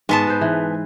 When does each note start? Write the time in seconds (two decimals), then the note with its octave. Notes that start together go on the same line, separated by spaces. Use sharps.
0.09 G#2 G#3 B3 A5
0.27 B4 C5
0.41 E3